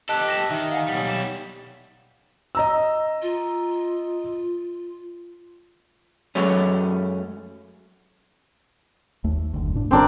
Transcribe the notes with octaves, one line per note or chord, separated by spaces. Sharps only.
G4 A4 D#5 A5 F#6
A#6 E7
D#3 E5
F5 F#5 G#5
B1 G3
E7
D#5 A#5 E6
F4
F#2 F#3 G#3 A3 C#4
D#2 A3
F#1 D2
A2 D4
G1 D#3 C4 D4 A#4